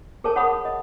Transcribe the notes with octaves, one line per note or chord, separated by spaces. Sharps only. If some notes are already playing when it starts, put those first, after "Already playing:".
G#4 A#4 C#5 A5
C#5 F#5 B5 D#6
D#5